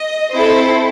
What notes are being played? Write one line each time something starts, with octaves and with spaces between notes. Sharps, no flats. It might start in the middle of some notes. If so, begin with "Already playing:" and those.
Already playing: D#5
C4 E4 A4 C5